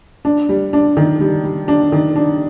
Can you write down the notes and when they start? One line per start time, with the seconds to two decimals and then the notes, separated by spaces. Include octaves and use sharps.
0.25 D4
0.49 G3
0.73 D4
0.97 D#3
1.21 G3
1.44 G3
1.68 D4
1.92 D#3
2.16 D4